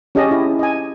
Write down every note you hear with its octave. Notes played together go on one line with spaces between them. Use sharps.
C#4 G4 G#4 D#5 A5
E4 G4
D#5 G#5